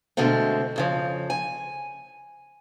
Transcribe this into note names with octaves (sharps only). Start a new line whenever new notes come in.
B2 D3 G#3 A3 C4
F2 C#3 F3
G#5